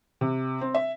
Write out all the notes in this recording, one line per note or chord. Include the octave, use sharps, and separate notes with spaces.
C3
C4
E5